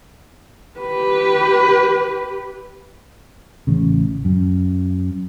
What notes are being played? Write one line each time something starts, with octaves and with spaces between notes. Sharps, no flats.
G4 B4
A1 C#3
F#2